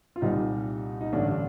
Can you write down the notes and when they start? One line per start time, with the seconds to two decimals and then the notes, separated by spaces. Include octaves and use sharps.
0.16 F4
0.22 C2 A#2 G3 D#4
1.01 D#4
1.12 A1 G2 D3 D4
1.27 D4